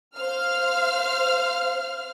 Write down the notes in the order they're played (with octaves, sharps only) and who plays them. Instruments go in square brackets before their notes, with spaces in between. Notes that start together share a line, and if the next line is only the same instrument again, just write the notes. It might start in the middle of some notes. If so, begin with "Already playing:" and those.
[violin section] C5 F5 F6